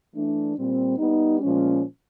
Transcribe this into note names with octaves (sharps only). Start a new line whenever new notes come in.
E3 A3 D4
A#2 G3 C4
G3 B3 D#4
A#2 F3 G#3 C#4